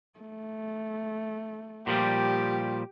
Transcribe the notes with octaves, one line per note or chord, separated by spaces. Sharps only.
A3
A#2 F3 G3 G4